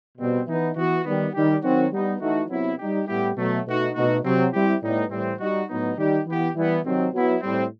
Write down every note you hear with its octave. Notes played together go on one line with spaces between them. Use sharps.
B2 G3 C4
E3 B3 D#4
E3 B3 F#4
D#3 G3 B3
D#3 G3 D#4 G4
D#3 F#3 C4 F#4
G3 B3 D#4
E3 A3 D#4 F#4
C3 F#3 B3 E4
G3 D#4 G4
A2 G3 B3 E4 G4
B2 F#3 A3
B2 A3 D#4 F#4
B2 A3 D#4 F#4
C3 F#3 C4
G3 C4 E4 G4
A2 G3 B3 D#4
A2 E3 G3 C4
G3 D#4 F#4
A2 F#3 B3 D#4
D#3 G3 D#4 G4
E3 B3 E4 G4
E3 G3 B3
C3 D#3 F#3 C4
F#3 B3 E4
A2 G3 C4